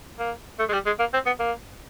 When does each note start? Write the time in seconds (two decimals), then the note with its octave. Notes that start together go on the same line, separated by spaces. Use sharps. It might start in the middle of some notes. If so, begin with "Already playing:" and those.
0.19 A#3
0.59 A3
0.69 G#3
0.73 G3
0.86 G#3
0.99 A#3
1.14 C4
1.26 B3
1.40 A#3